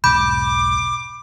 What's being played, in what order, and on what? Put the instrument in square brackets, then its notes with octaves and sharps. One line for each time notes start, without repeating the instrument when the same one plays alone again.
[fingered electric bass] E1 B1 G#2 [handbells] B5 G6 [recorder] D6